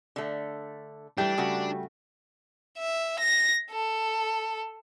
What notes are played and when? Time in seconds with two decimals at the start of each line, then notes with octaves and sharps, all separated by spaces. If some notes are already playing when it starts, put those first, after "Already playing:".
0.16 D3 A3
1.18 E3 G3 A3 D4 G5
1.38 C#3 A3 F#4
2.78 E5
3.19 A#6
3.71 A4